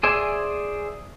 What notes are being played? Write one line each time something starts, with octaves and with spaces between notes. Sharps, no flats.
G#4 C5 D5 E5 G#5